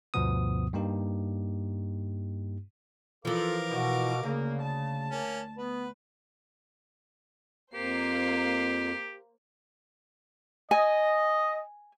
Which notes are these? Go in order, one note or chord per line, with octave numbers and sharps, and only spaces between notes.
D2 G2 B2 F3 B3 D#6
G2 A#3 D#4 G4
E3 F3 F4 A4 A#4 F5 D6
B2 F#4
D2 C#3 A#3
A5
A#3 C#4
B3 B4
F2 A#3 G4 C5 C7
D#5 G#5